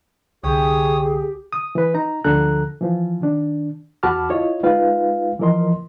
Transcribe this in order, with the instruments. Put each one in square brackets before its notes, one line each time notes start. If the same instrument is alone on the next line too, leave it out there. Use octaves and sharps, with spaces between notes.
[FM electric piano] C2 D3 [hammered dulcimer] G4 [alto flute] G#4 [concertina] C#5 D#6
[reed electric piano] D#6
E3 B4
D#4 A#5
D2 D3 F3 A4 A#5 F#6
E3 F3
D#3 D4
E2 F#4 A5 B5 D6 F6
E4 F4 C#5 D#5
G#3 D#4 F4 B4 F5
E3 F3 A#4 D#5 C6